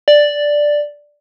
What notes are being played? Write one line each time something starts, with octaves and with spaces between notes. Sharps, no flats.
D5